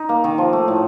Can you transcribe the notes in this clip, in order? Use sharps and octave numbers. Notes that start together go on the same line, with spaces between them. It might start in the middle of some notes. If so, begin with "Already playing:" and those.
Already playing: D#4
A#3
D#3
F3
A3
A2